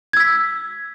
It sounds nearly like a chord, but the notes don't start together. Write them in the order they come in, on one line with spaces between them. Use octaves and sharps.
G#6 E6 B6